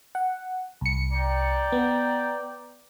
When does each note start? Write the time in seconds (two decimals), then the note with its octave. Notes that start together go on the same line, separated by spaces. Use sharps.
0.15 F#5
0.81 C2 C#7
1.12 D5 G5 A#5
1.72 B3